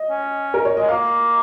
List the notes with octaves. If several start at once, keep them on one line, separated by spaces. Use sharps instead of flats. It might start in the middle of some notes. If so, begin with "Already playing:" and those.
Already playing: D#5
C#4
A#4
C#5
G#3 D#5
A#3 F5